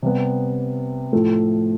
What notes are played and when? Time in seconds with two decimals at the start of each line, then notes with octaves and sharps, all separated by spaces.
0.03 C3 G3 B3
1.12 A2 F3 A3